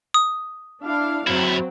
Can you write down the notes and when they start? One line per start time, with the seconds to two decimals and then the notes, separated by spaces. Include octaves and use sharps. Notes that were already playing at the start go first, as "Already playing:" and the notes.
0.14 D#6
0.82 D4 E4 F5
1.27 F#2 F#3 C4 E4